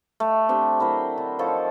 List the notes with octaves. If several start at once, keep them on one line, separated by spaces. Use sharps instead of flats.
A3
C4 D4 G4
F#3 E4 A#4 C5
D3
D#3 F3 A4 C#5